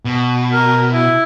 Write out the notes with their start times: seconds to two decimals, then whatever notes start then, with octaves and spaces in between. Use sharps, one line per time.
0.05 B2
0.53 A#4
0.92 E4